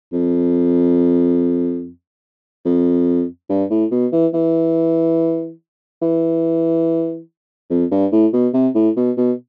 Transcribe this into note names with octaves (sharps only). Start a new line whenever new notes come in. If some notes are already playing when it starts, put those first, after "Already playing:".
F2
F2
G2
A2
B2
E3
E3
E3
F2
G2
A2
B2
C3
A2
B2
B2